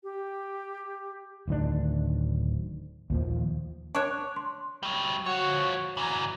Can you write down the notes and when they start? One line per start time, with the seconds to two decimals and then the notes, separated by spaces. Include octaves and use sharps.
0.04 G4
1.48 D1 D2 D#3 D4
3.10 D#2 A#2 F3
3.95 D4 C#5 C#6 F#6
4.36 C6
4.83 F#3 G3
5.26 F3 F#4 C#5
5.97 E3 F#3 A#5